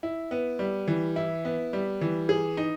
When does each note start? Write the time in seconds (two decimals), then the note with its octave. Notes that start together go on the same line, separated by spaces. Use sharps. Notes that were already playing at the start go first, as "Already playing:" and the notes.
0.03 E4
0.31 B3
0.59 G3
0.88 E3
1.16 E4
1.45 B3
1.73 G3
2.01 E3
2.29 G#4
2.57 D#4